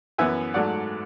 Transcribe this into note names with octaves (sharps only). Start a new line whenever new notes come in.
F#2 E3 B3 E5 G#5
G#2 F#3 A3 D5 F#5